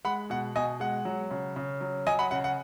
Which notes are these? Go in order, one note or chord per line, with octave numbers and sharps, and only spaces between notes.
G#3 F#5 B5
B2 F#5
B2 D#5 G#5
G#3 F#5
F#3
C#3
C#3
F#3
F#3 D#5 G#5
F#5 B5
C#3 F#5
F#5